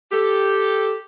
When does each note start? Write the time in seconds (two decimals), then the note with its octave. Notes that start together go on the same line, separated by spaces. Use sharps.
0.12 G4 A4